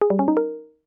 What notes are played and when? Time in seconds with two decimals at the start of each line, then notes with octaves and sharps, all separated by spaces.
0.02 G#4
0.10 G3
0.19 C#4
0.28 D#4
0.37 A#4